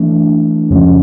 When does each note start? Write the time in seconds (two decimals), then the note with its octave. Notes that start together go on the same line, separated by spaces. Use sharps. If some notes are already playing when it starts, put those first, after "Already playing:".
Already playing: E3 A3 D4
0.70 F2 C#3 F3 G#3 C#4